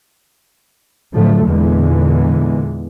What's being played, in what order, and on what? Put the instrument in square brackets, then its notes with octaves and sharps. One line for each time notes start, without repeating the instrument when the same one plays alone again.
[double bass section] A2 D3 F3 F#3 A3
E2 A#2 D3 E3 G#3